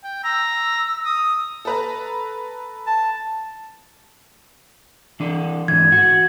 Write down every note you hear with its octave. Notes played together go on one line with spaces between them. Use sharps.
G5
A#5 E6
D#6
A4 B4 A#5
A5
E3 D4
G#2 E3 G#6
F#4